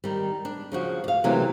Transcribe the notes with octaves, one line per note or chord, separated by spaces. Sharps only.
D#3 G3
D4
C#3 F3 F#4
D5 F5
C3 E3 F#3 A3 A#3